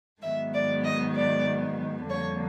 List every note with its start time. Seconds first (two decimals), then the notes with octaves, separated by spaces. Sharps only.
0.22 G#2 D#3 F#3 B3 E5
0.53 D5
0.84 D#5
1.15 D5
2.09 F2 D3 G3 A#3 C#5